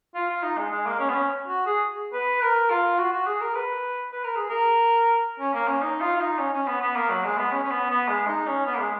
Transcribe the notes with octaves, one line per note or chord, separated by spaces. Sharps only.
F4
F4
D#4
G#3
G#3
A#3
C#4
B3
C#4
F#4
G#4
B4
A#4
F4
F#4
F#4
G#4
A#4
B4
B4
A#4
G#4
A#4
C#4
A#3
C#4
D#4
F4
F4
D#4
C#4
C#4
B3
B3
A#3
F#3
G#3
B3
C#4
C#4
B3
B3
G#3
D#4
C#4
B3
A#3
G#3